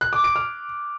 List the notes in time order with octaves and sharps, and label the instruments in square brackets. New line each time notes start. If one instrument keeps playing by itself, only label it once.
[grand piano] F#6
D6
D7
F6